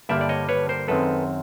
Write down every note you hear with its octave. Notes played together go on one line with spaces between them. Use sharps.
G2 D3 G3 A#3 D5 E5
D5
C#5 D#5
B4 C#5
A#4 C5
F#2 D#3 G#3 C4 A4 B4